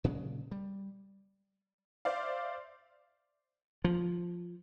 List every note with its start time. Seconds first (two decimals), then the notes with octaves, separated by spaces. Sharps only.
0.04 A#2 C#3 F#3 G#3
0.51 G3
2.05 C5 D5 E5 F5
3.84 F3